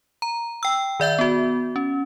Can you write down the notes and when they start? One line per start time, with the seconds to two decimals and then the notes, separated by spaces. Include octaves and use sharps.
0.22 A#5
0.63 G5 E6
1.00 D#3 D5 E5 G6
1.19 B3 F#4
1.76 C#4